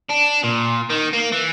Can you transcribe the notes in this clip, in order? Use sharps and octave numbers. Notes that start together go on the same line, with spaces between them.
D4
A#2
D#3
A#3
E3